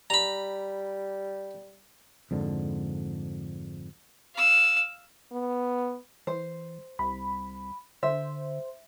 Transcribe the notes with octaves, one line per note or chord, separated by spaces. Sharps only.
G3 A#5 B5
F2 G#2 D3
F5 E6
B3
E3 C5
C2 B5
D3 C5 E5